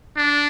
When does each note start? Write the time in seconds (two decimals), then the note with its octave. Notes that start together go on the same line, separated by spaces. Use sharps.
0.17 D4